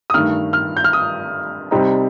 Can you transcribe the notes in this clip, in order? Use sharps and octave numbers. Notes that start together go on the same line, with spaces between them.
D#6
G2 D#3 A3 F6
F6
G6
F6
D#6
C2 C3 G3 C4 D#4